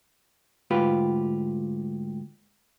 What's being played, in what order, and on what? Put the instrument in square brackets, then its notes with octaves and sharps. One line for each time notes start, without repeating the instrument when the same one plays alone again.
[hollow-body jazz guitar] D2 G#2 F4 G4 B4